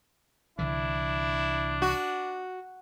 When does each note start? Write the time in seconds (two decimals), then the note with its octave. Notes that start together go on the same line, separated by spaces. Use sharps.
0.59 C2 D3 E3 D4 E4
1.82 F#4